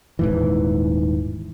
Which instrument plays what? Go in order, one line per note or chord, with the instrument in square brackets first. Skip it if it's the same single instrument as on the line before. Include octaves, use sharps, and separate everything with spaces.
[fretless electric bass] D#1 G#2 E3